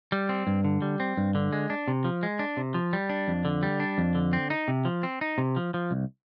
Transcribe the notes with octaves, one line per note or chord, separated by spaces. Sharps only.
G3
C4
G2
D3
G3
C4
G2
D3
G#3
D4
C3
F3
G#3
D4
C3
F3
G3
D4
F2
D3
G3
D4
F2
D3
C4
D#4
C3
F3
C4
D#4
C3
F3
F3
C2